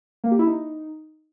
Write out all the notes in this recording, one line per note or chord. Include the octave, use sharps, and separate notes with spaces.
A#3
G4
E4
D#4